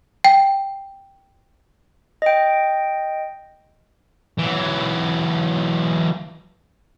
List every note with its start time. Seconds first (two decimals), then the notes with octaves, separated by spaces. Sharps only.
0.24 G5
2.22 D#5 G5
4.39 E3 F#3